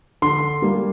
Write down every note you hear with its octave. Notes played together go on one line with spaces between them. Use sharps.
D3 C6
G3 A#3 D4